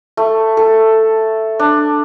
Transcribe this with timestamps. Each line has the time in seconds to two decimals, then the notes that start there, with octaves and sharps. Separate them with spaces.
0.17 A3
0.57 A4
1.60 D4